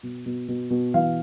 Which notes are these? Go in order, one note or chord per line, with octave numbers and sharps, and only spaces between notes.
B2
B2
B2
B2
E3 F5